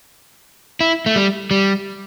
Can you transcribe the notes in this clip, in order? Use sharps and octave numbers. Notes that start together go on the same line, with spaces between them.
E4
A3
G3
G3